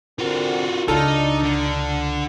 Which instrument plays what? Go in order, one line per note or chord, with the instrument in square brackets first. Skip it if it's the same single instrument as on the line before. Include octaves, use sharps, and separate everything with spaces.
[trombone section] D3 C4 A#4 [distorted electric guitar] F4 F#4
[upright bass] C#2 [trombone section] D4 [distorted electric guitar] D#4 [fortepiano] F4 A4
[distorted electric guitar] D3